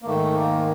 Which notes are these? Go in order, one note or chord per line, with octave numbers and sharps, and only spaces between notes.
A#3
G#2 D#3 A3
A#3